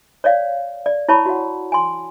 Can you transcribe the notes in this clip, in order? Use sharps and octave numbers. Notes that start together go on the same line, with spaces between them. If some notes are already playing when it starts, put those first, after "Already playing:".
C#5 D5 F5
D5
E4 C#5 A5 B5 C#6
F#4 F#5
G#5 C6